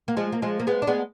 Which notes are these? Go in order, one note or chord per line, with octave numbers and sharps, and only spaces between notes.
A#3
F3 G#3
A#3
F3 G#3
A#3
G#3 B3
D4
G#3 B3